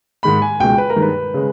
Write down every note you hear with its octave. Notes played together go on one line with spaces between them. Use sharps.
G#2 D#3 G#3 B5
G#5
C#2 B2 G#3 G5
B4
A#4
G2 D#3 G#3
B4
C#3 G#3